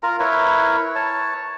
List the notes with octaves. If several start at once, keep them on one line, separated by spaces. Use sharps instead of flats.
F4 A#4 A#5
E4 A#4 B4 C#5
C#5 A5